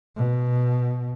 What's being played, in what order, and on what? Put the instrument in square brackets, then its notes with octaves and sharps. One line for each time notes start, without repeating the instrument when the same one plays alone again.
[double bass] B2